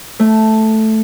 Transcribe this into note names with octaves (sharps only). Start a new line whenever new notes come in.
A3